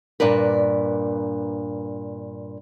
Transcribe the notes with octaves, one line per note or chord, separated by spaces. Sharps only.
G2 A#2 D4 A#4 B4